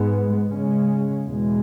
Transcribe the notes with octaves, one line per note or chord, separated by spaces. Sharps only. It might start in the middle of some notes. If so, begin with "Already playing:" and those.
Already playing: G#2 G#3 B3
C#3 G#3 C#4
E2 B2 G#3